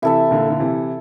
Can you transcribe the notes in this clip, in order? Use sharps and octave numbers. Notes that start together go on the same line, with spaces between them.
C3 E3 E4 A4 E5
A#2 D3
D3
C3 E3